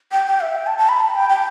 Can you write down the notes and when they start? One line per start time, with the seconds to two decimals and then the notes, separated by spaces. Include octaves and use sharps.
0.12 G5
0.27 G5
0.41 E5
0.56 G5
0.67 A5
0.78 A5
0.89 B5
1.00 A5
1.15 G5
1.30 G5